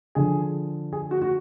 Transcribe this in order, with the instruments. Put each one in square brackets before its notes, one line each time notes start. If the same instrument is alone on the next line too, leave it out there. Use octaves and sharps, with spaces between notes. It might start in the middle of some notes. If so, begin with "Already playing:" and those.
[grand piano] D3 F3 G#4
G#4
F#4
F#4